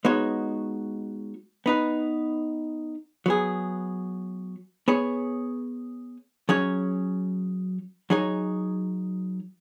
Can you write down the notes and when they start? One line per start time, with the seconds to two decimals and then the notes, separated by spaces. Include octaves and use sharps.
0.05 G#3 B3 D#4 F#4 C#5
1.66 B3 D#4 B4
3.26 F#3 B3 G#4
4.88 B3 G#4 C#5
6.49 F#3 C#4 G#4 C#5
8.10 F#3 D#4 G#4 C#5